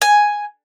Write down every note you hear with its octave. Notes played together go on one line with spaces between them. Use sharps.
G#5